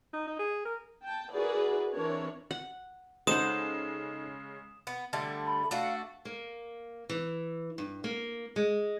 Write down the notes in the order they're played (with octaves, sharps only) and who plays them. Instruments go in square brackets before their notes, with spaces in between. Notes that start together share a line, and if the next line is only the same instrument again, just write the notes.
[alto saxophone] D#4
D#4
G#4
A#4
[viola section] G5 A5
E4 F#4 G#4 A#4 B4 D5
E3 C4 D4 A#4 C#5
[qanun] F#5
[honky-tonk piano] C#3 G#3 [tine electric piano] D#4 A4 [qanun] C5 F#5 [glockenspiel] D#6 E7
[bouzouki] B3
D3 G3 A3
[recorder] B5
[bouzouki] A3 D4 F#4 [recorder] F5
[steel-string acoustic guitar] A#3
E3
G2
A#3
G#3